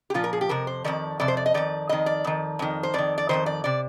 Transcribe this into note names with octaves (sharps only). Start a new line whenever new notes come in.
G4
A#2 F3 F4
A#4
G#4
G4
F2 C3 A#4
C5
F2 C3 D#3 D5
F2 C3 D5
C5
D5
D#5
F2 C3 D#3 D5
F2 D#3 D#5
D5
F2 D#3
F2 D#3
C5
F2 D#3 D5
D5
F2 C3 D#3 C5
D5
C3 D5